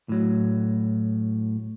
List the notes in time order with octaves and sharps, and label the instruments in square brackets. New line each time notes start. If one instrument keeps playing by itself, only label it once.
[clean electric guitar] A2 F#3